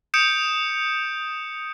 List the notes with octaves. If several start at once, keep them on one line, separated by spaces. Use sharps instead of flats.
D#6 G6 C#7 D7 E7